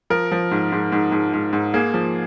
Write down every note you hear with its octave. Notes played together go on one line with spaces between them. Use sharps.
F3 A#4
F3
G#2
G#2
G#2
G#2
G#2
G#2
A#3 G#4
F3